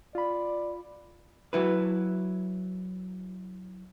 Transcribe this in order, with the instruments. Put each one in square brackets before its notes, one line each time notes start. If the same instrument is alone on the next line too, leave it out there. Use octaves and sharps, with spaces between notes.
[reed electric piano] F4 B5 [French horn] D5
[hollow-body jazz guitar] F#3 E4 B4